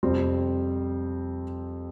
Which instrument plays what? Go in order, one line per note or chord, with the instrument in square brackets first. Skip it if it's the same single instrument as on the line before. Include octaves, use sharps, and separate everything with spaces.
[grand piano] F2 C3 G3 C4